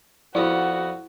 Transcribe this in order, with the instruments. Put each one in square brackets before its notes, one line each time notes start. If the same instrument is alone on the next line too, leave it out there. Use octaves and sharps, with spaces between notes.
[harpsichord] F2 B3 [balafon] E4 [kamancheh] F#4 [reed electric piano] D5